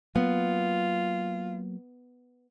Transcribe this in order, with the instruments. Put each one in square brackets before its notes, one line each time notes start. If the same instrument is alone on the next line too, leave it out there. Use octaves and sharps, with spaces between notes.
[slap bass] F#3 A#3 [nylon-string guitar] B3 [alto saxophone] F4